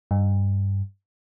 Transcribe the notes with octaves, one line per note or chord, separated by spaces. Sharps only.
G2